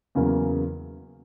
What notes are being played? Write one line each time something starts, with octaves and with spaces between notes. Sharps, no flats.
E2 C#3 F#3 A#3